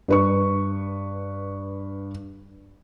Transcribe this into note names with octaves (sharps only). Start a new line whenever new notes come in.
G2 B4 C#6